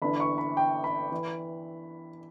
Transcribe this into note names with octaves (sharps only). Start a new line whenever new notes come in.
G1 G2 E3 B5
C#6
B5
G5
B5
E3